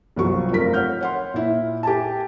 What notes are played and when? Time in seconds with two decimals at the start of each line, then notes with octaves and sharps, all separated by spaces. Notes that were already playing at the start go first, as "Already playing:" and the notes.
0.16 G1 C2 F3 F#3 C#6
0.50 F1 F3 A#4 B6
0.73 C#5 F#5 F6 G6
1.01 C#5 F#5 C6
1.34 A#2 E4
1.83 G4 G#5 A5